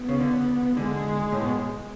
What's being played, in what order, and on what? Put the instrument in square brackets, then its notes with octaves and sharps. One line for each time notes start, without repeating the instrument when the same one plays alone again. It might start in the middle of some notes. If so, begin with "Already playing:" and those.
Already playing: [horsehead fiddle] B3
[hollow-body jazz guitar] C#3
D3
[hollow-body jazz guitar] D3 [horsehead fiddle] G#3
[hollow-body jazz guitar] A2
B2